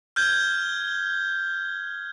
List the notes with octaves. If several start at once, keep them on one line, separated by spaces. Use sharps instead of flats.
F6 G6 G#6 G7